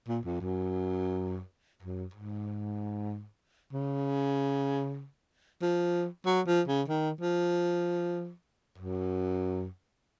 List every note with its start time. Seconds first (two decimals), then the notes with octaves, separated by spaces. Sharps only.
0.08 A#2
0.25 F2
0.41 F#2
1.83 F#2
2.14 G#2
3.73 C#3
5.62 F3
6.26 F#3
6.47 F3
6.68 C#3
6.88 D#3
7.21 F3
8.78 F#2